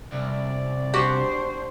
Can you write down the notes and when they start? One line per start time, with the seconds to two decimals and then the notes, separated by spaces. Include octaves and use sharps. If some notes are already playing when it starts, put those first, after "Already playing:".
0.13 C2 D5
0.94 D4 F#4 G4 C5